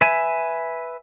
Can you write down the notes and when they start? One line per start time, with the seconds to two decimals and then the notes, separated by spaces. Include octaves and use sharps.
0.01 B4 E5 G#5